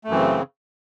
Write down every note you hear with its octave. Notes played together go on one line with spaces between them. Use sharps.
F#2 C#3 E3 A3 C4